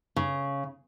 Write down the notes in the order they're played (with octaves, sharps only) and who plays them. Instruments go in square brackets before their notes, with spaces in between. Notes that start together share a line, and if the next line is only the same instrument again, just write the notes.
[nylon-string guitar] C#3